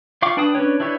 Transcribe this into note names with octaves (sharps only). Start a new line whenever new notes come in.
F4 F5 G5 C#6 D6
D4 B4 G5 A5 D#6
C#4 D4 B4 C#5
D4 E4 G4 B4 C#5